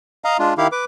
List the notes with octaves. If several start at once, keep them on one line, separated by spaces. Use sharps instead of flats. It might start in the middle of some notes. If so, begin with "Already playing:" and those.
D#5 F5 A#5
G#3 D4 F4
D#3 E4 G4 F5
B4 D6